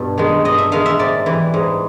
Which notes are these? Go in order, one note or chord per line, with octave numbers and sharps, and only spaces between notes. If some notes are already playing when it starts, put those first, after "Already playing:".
Already playing: G2 B2
D#3 G#3
G2 D#5
E5
D#3 G#3 F5
E5
G#2 D5
E3 G3
G#2